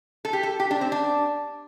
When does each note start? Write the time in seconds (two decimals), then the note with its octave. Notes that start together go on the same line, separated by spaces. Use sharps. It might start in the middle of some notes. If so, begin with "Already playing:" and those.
0.25 A4
0.33 G4
0.43 A4
0.60 G4
0.71 D4
0.81 C4
0.92 D4